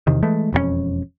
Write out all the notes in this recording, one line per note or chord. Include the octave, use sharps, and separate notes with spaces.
E2 C3 D#3
E3 G#3 A3
E1 F2 F3 C#4